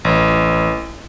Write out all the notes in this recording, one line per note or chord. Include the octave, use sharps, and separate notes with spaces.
A1